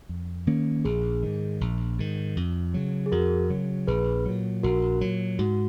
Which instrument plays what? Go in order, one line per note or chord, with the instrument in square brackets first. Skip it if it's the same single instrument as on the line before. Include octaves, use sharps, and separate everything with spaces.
[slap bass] F2
D#3 A#3 C#4
[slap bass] A#1 [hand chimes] G#4
[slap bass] G#2 D#3
A#1
G#2 D#3
F2
C#3 F#3
[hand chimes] G#4
[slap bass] F2 [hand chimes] F#4 A#4
[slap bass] C#3 F#3
[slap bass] A#1 [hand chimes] G#4 B4
[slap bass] A#2 F#3
[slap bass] A#1 [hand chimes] F#4 A#4
[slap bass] A#2 F#3
[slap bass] G#2 [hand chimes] F#4